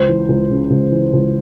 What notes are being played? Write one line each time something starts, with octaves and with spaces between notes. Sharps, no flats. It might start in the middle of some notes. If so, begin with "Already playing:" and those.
Already playing: C#2 C5
E3
C#2
C#3
C#2
E3
C#2